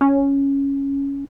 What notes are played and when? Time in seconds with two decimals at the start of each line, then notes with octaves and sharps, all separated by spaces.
0.01 C#4